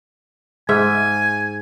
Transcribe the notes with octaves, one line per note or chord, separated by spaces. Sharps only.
G#2 E5 G#5